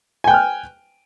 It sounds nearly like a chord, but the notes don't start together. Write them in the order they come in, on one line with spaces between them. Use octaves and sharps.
G#5 G5 F#6 F6